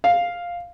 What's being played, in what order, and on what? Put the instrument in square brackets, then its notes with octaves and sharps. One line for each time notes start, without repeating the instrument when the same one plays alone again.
[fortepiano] F5